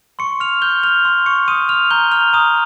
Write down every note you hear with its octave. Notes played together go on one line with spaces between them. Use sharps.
C6 C#6 C#7
F6 F7
F6 G6 G7
F6 F7
C6
C#6 C#7
C6 D#6 D#7
F6 F7
A#5 G6 G7
F6 F7
A#5 D#6 D#7